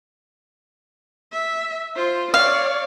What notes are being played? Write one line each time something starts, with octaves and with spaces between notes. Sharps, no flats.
E5
F4 C5
C#5 D5 F5